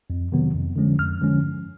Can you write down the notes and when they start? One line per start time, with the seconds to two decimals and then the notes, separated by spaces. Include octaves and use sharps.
0.10 F2
0.32 C3 D#3 F#3 B3
0.54 F2
0.76 D3 F3 G#3 C#4
0.99 F2 F6
1.21 D3 F3 G#3 C#4
1.43 G2